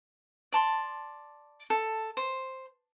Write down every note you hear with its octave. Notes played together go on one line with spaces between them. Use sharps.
D5 A5 C6
A4
C5